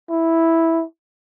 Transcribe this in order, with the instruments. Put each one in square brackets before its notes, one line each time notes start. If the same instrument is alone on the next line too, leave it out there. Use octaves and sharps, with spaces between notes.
[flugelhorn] E4